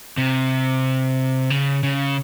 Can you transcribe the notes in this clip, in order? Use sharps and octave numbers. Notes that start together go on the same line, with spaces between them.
C3
C#3
C#3